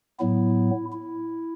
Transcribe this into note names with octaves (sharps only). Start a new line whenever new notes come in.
A2 F#3 B3 E4
E4